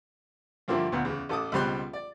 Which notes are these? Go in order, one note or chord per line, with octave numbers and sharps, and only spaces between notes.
G2 D3 F3 A#3 C4 E4
D2 A#2 B3
E2 C#3
A1 A4 D6 D#6
C#2 B2 G3 C4 C6 F#6
D5